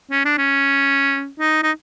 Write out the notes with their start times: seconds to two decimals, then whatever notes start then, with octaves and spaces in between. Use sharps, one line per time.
0.11 C#4
0.25 D4
0.38 C#4
1.40 D#4
1.63 D#4